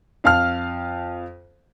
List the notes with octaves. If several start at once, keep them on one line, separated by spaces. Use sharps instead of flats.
F2 F5 A5 F6